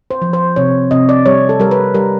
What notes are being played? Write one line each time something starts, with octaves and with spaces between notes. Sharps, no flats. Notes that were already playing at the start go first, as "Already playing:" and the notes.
C5
F3
C5
C3 C#5
C3 D#5
D5
G3 C#5
A4
G3 A#4
B4
G3 A#4